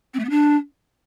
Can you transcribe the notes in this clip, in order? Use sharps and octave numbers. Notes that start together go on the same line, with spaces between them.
C4
A3
B3
D4